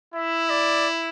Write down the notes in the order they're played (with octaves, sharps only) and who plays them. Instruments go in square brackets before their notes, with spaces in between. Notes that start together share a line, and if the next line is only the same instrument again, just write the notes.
[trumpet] E4 [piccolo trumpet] E5
[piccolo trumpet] D5